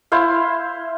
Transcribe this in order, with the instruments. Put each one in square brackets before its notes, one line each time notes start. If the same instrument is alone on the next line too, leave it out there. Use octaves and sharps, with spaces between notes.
[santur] E4 C5 F5